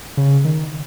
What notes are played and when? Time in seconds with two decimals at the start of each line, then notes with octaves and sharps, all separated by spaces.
0.17 C#3
0.45 D#3